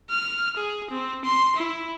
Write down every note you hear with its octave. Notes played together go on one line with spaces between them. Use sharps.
F6
G#4
C4
C6
E4